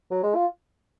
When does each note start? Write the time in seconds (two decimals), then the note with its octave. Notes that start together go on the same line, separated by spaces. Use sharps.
0.11 F#3
0.23 G#3
0.35 F4